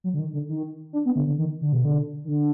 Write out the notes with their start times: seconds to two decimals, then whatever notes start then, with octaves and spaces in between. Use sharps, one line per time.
0.04 F#3
0.14 D3
0.19 D#3
0.33 D3
0.49 D#3
0.93 D4
1.05 B3
1.16 D3
1.27 D3
1.38 D#3
1.61 D3
1.73 B2
1.85 D3
2.25 D#3
2.28 D3